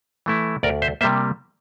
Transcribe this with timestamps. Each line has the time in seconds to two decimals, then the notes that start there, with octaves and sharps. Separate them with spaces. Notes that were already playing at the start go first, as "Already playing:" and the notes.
0.26 E3 A3 E4
0.63 D2 A#4 D5
0.82 C5 E5
1.01 C3 G3 A#3 C5 E5